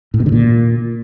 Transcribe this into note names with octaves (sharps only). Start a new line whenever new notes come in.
A2
B2
D3
A#2